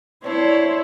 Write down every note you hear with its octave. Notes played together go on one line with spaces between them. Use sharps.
C4 D4 E4 C5 C#5